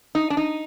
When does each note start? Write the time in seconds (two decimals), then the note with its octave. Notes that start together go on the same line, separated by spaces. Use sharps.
0.15 D#4
0.30 D4
0.37 D#4